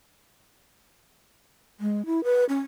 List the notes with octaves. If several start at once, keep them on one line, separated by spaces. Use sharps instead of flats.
G#3
E4
B4
C#4